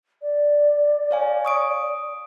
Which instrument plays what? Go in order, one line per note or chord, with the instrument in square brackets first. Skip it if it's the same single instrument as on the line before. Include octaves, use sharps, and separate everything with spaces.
[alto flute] D5
[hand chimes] C#5 F5 G#5
C#6 D#6 D7